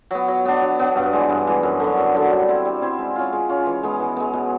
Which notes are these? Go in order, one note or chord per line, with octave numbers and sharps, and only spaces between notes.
F#3 B3
F#3
B3 D4
F#3
B3 D4
G2
E3 G#3
G2
E3 G#3
F#2
D3 F#3
F#2
D3 F#3
G3
C4 E4
G3
C4 E4
G#3
C#4 F4
G#3
C#4 F4
E3
G#3 B3
E3
G#3 B3
B2